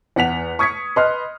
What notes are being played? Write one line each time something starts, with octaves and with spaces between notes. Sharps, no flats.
E2 F#5 B6 F7
C#6 D#6 G#6 B6 C#7
B4 D#5 B5 C6 F6